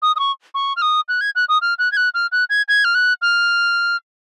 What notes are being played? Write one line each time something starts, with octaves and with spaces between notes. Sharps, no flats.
D#6
D#6
C#6
C#6
F6
D#6
F#6
G#6
F#6
D#6
F6
F#6
G#6
F#6
F6
F#6
G#6
G#6
F6
F#6
F6